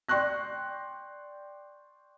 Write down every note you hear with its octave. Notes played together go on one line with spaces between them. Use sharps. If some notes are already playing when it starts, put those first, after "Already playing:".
D5 G5 C6 C#6 F#6 A#6